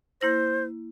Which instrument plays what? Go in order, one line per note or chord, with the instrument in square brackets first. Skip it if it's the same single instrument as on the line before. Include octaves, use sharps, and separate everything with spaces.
[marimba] A#3 E4 A#6 [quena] C5